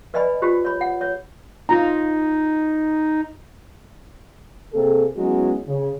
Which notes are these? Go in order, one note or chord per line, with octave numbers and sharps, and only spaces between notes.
B4 D5 D#5 G#5 B5
F4 G4 C5
C#5 B5
F#5
C#5
D#4 F4 A#5
C3 A#3 C4 G#4 A4
F#3 G#3 B3 C#4 E4 F#4
C#3